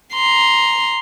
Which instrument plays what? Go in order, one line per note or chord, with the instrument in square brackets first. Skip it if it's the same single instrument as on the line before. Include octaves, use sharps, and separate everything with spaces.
[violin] A#5 C6